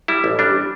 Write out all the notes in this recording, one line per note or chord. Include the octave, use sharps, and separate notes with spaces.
G3 E4
A1
G3 D4